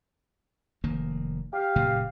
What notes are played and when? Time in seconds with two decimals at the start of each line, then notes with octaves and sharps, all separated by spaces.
0.84 F1 D#3 A#3
1.53 G4 F5
1.76 F#1 A#2 C#3